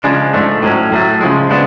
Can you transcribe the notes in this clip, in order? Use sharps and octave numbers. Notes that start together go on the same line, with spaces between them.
C#3 F3 G#3 D4
G#2 F3 A3 D4
A2 F#3 C#4
A2 F#3 A3
C#3 F3 G#3
C#3 G#3 B3 D4